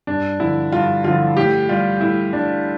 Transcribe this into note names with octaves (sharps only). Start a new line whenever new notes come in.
G2 D4
D3 F3 E4
G2 F4
D3 F3 F4
A2 G4
G3 F4
A2 E4
G3 D4